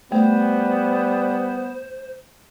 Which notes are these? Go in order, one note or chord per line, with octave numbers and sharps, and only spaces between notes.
G3 A3 B3 C5